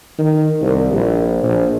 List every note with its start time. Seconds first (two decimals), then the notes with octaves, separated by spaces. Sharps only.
0.18 D#3
0.61 C2
0.92 A#1
1.43 A#1